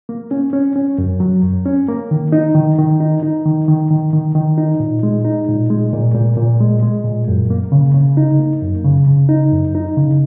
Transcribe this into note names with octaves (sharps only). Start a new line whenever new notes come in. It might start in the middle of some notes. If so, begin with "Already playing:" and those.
A#3
C#4
C#4
C#4
F#2
F#3
F#2
C#4
A#3
D#3
D#4
D#3
D#3
D#4
D#4
D#3
D#3
D#3
D#3
D#3
D#4
A#2
G#3
D#4
A#2
G#3
A#2
A#2
A#2
G#3
G#3
A#2
F#2
A#3
C#3
C#3
D#4
A#3
F#2
C#3
C#3
D#4
F#2
D#4
C#3